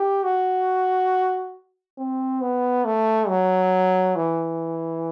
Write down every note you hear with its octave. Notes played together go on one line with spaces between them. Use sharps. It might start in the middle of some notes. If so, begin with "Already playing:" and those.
Already playing: G4
F#4
C4
B3
A3
F#3
E3